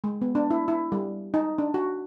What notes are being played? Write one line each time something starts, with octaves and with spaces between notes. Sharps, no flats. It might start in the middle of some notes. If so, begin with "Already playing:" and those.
G#3
B3
D4
E4
E4
G3
D#4
D4
F#4